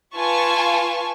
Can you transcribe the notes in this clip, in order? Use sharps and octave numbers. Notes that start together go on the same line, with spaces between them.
F4 B4 G#5 A5 C#6